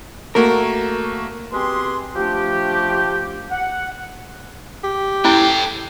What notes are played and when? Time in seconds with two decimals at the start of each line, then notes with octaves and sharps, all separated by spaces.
0.35 A3 A#3 F#4 A#4
1.53 B2 C4 G4 G#4 B4 C6
2.16 F3 A3 D4 G4
3.51 F#5
4.84 G4
5.24 C#4 E4 A4 G5